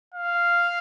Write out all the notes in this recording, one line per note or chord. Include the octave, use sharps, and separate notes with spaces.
F5